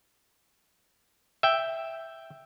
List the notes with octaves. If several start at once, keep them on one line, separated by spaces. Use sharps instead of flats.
E5 G5